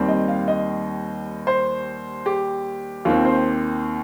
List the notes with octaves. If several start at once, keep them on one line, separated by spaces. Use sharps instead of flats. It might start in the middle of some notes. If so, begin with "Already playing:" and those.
Already playing: D#2 D#3 G3 C4
D#5
F5
D#5
C5
G4
D#2 D#3 C4 F4
C5